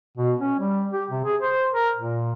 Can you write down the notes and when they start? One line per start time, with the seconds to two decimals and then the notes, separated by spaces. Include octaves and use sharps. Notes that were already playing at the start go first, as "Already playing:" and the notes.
0.18 B2
0.39 C#4
0.59 G3
0.93 G4
1.10 C3
1.25 G#4
1.41 C5
1.73 A#4
1.96 A#2